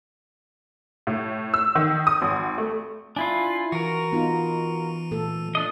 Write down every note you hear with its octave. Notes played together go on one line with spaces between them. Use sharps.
A2
E6
D#3
D#6
G#1
A3
D4 E4 F4 G#5
E3 F#4 A#4
B3 D#4 F4
A#2 A3 A4
D4 D#5